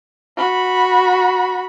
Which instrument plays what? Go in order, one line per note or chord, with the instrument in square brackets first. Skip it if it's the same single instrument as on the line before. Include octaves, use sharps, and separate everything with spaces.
[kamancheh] F#4 B5